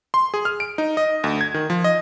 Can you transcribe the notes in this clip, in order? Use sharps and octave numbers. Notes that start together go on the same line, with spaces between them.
C6
G#4
F6
D7
D#4
D#5
D2
G#6
D#3
F3
D#5